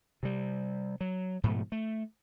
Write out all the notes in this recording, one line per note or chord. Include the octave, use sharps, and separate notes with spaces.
C3 G3
F#3
G#2 B2 F3 A3
A3